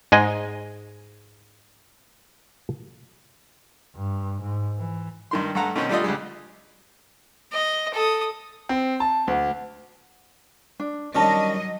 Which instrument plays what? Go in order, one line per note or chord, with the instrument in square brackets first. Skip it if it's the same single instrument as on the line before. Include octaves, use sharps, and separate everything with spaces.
[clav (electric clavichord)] G#2 G#3 D#5 G#5
[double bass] G2
G#2
E3
[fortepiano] G2 D#3 C6
G2 A3 A4 F#5 A#5
B2 D#3 C4 C#4
G3 A3 D4 F4 A4 D#5
D2 G3 G#3
[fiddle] D#5
A4 D#6
[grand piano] C4
A5
D2
[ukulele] D4
[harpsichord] D#3 G3 D4 [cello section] F#3 D#5 [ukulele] C#4 A5